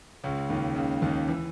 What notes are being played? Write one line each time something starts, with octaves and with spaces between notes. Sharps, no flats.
C#2 C#3
D#2 D#3
C#2 C#3
D#2 D#3
E3